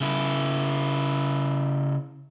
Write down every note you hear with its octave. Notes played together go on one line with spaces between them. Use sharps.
C#3 E4